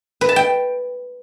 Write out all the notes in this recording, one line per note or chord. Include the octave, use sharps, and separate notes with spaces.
B4
A5
G5